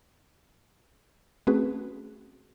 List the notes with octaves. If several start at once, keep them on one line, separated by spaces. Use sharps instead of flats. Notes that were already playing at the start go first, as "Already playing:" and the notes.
A3 C4 C#4 F#4 G#4 B4